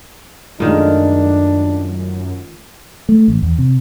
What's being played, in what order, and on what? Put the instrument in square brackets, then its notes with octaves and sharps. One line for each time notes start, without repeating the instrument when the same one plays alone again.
[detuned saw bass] F#2 [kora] A#2 D#3 [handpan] G#3 A3 A#4 [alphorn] D4
[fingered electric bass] A3
A1
E2
C3